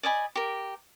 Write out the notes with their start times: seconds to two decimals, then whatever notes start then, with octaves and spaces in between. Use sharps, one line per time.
0.03 D5 D#5 G#5 B5
0.35 G4 A#4